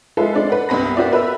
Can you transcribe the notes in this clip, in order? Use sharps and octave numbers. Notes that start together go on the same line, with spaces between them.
G#3 F4 A4 B4 E5
G#3 C4 D4 D5
B4 F#5
C2 G2 B3 B5 A#6
A#3 B3 F#4 G4 D5 E5
A#4 B4 E5 B5 E6